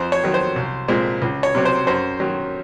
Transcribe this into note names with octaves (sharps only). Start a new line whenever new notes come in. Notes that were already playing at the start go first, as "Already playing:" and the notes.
Already playing: F2 C5
C#5
D#3 F#3
C5
C2
A#2 G#3 C4
C#2
C#5
C3 F#3 C4
C5
F#2 C5
D#3 F#3